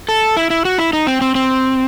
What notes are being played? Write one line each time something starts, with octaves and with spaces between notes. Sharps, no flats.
A4
E4
E4
F#4
E4
D#4
C4
C4
C4